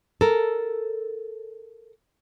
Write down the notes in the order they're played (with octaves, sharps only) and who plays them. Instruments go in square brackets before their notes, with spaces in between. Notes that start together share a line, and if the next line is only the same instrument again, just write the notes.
[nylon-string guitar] A4 A#4